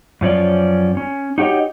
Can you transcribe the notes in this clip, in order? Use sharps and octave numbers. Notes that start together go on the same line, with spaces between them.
F#2 F3 C#4 D5
C#4
D#4 F#4 G4 C#5 D#5